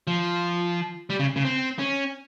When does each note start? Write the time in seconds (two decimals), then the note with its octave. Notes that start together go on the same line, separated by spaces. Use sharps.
0.07 F3
1.10 G3
1.19 C#3
1.36 C#3
1.45 C4
1.79 C#4